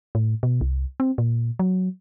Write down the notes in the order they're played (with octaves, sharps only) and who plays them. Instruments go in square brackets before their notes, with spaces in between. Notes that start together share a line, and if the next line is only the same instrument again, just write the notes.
[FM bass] A2
B2
C2
C4
A#2
F#3